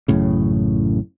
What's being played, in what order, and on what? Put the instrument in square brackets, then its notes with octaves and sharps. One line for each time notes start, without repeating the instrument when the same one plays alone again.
[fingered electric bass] A1 F#2 A2 C#3